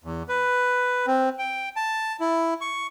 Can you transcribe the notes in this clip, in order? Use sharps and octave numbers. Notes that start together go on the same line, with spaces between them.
E2
B4
C4
G5
A5
E4
C#6